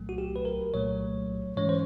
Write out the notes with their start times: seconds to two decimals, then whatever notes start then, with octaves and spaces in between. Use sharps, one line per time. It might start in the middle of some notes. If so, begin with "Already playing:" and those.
Already playing: C2 A#2 F#3 A3
0.09 F#4
0.18 G4
0.36 B4
0.45 A#4
0.74 C2 A#2 F#3 A3 C#5
1.57 G#2 E3 G#3 C#4 C#5
1.69 C5